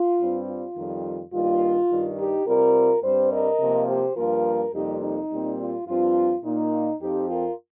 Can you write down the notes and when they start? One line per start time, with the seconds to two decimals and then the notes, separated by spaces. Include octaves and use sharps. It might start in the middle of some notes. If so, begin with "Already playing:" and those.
Already playing: F4
0.19 G2 G3 C4
0.47 F4
0.75 F2 D#3 G3
1.32 G2 D#3 G3 A#3 F4
1.89 G2 D#3 G3
2.17 D#4 G4
2.46 C3 G3 C4 F4 A#4
3.02 G2 G3 C4 G4 C5
3.31 A#4 D#5
3.60 C3 F3 A#3
3.88 G4 C5
4.16 G2 F3 A#3 F4 A#4
4.73 F2 C3 G3 A#3 D#4 G4
5.02 D#4
5.30 A#2 G3 C4
5.58 F4
5.87 G2 F3 C4 F4
6.44 A#2 A#3 D#4
7.00 F2 F3 C4 D#4 G4
7.29 F4 A#4